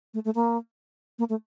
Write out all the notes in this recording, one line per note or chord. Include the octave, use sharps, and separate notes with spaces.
A3
A3
A#3
A#3
A3